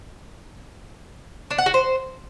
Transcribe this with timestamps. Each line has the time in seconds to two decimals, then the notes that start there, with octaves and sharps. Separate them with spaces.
1.51 D4
1.58 F#5
1.66 F#4
1.74 C5